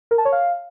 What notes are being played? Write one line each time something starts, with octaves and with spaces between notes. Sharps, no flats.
A#4
A5
C#5
F5